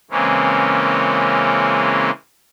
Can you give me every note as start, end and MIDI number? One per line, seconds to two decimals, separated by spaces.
0.11 2.10 49
0.11 2.10 52
0.11 2.10 56
0.11 2.10 58
0.11 2.10 60
0.11 2.10 61